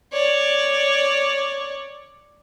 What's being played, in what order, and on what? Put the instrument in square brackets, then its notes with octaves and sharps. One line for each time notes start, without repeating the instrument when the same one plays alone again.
[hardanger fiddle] C#5 D5